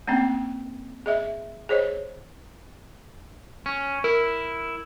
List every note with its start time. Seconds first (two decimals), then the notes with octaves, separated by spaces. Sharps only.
0.08 A3 A#3 C4 C#4 G5
1.06 G#4 D#5 E5
1.69 G#4 C5 C#5 D#5
3.66 C#4
4.04 E4 A#4